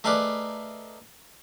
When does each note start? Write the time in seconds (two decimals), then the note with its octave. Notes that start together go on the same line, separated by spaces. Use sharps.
0.04 A3 D#4 G#4 A#4 B4 D5